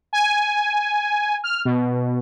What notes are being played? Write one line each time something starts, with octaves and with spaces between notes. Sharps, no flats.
G#5
F6
B2